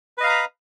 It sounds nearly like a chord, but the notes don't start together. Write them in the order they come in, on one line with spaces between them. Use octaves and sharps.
B4 D#5 F5 A#5 B5